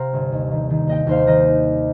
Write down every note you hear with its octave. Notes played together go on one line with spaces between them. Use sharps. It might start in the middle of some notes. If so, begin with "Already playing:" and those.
Already playing: C3 F5 G5 A#5 C6
G1
D#2
D#3
D#3
D#2 D#5 G5
D#2 C5 F5
D#3 A#4 D#5